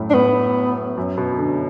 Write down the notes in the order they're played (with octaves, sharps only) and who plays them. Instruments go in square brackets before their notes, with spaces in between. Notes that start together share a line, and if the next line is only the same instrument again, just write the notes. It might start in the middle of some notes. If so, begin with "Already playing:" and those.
Already playing: [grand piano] F#2 A2
[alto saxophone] D4
[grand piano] A2 [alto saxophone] B3
[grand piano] F#2
B2
D3